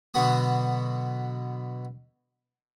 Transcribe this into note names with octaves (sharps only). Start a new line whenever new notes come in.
B2 D3 F#3 B3 F#4 D#6